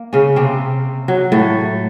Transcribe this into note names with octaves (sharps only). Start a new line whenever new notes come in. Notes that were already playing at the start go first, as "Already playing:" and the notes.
Already playing: A#3
C#3 C#4
C3 C4
F#3
A2 A3